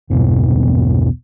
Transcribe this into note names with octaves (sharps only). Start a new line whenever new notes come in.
A#1 E2 G2 B2